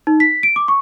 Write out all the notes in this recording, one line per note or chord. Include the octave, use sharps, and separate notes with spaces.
D#4
B6
D7
D6
C#6